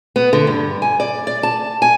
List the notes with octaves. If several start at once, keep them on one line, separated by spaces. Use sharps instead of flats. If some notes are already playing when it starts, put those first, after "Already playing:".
B3
D3
G2
G#5
D5
D5
A5
G#5